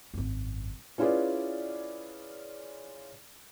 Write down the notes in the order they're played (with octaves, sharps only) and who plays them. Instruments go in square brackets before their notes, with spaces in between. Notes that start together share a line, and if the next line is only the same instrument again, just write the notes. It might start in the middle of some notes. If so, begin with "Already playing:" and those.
[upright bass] G#1 F#2
[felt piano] C#4 E4 F4 G#4 B4 D5